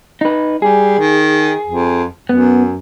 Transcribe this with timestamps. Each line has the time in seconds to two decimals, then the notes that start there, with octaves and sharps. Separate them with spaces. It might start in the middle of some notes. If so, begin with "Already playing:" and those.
0.21 D#4 B4
0.62 G3 G#4
0.99 D#3
1.67 F2
2.29 F#2 B3